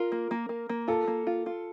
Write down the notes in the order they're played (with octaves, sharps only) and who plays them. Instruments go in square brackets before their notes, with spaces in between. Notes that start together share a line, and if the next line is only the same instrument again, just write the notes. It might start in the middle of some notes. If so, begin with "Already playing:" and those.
Already playing: [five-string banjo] F4 [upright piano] A#4
[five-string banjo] A#3
A#3
A#3
A#3
[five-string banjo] F4 [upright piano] A4
[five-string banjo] A#3
F4
F4